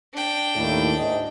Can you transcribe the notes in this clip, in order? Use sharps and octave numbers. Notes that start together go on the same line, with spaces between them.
D4 G5
D#2 A2
D2 G#2 D#5